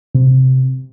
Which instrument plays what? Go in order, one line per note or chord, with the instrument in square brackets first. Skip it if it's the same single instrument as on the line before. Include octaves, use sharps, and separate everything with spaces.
[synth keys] C3